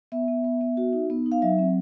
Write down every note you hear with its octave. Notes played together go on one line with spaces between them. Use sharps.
B3 E5
B3
B3
B3
F#4
D#4
B3
D#4
F5
F#3 E5
C4